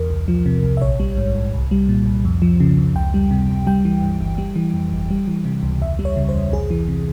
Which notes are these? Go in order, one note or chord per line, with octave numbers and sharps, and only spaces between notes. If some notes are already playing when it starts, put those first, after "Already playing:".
Already playing: E2 A#4
C2
F3
C3
C2
E5
A#1 C#5
G3
G#2
A#1
C2
G3
A#2
C2
F2
F3
C#3
F2
C#2 G5
G3
C3
C#2
G3 G5
E3
G2
G1
G3
E3
F2
G1
G3
E3
C3
C#2
E2 E5
G3
C#5
C#3
C5
E2
C2 G#4
E3
C3